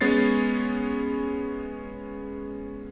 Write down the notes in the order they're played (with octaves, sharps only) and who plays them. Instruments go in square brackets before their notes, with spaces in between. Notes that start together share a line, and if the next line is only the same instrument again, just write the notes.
[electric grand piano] G#3 B3 C#4 A6 C7